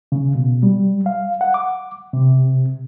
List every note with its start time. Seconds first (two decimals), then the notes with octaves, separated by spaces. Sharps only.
0.12 C#3
0.35 B2
0.63 G3
1.06 F5
1.41 F#5
1.54 D6
2.13 C3